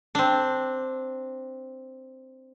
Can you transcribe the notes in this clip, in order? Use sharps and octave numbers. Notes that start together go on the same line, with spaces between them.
C4 D4